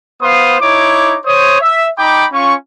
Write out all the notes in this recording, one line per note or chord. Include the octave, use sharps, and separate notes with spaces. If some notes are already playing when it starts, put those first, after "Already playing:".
B3 B4 C5 F5 C6 D#6
D#4 E4 C#5 D6
C5 C#5 D#6
E5
D#4 G5 B5 D6
C#4 F4 C#6